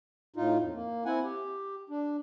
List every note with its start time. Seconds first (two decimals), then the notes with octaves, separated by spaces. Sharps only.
0.36 A2 D#4 F4
0.61 F2
0.74 A#3
1.05 C4 E4 F#5 G#5
1.24 G4
1.90 D4